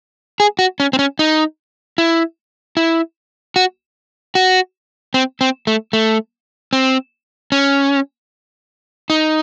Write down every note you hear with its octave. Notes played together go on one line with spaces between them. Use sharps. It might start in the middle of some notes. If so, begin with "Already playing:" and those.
G#4
F#4
C#4
C4
C#4
D#4
E4
E4
F#4
F#4
C4
C4
A3
A3
C4
C#4
D#4